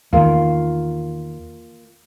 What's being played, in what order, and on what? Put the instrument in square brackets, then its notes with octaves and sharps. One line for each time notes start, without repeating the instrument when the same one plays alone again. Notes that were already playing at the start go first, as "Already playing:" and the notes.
[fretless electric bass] E2 D#3 [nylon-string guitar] A#3 F4